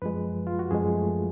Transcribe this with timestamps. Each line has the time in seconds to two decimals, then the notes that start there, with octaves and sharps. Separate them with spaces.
0.02 F#2 F3 G#3 B4
0.47 F4
0.59 F#4
0.71 F#2 F3 G#3 G#4
0.95 A3